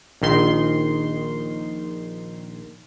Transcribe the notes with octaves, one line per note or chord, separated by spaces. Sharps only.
A#1 D#3 C6